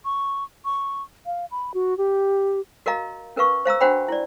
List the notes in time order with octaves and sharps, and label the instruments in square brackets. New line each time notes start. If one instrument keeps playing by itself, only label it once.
[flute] C#6
C#6
F5
B5
F#4
G4
[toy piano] F#4 A#4 D#5 F5 A#5
C#4 A#4 B4 F5 C#6
C5 F5 A#5 E6
D4 F#4 C5 F#5 G5 B5
E4 D5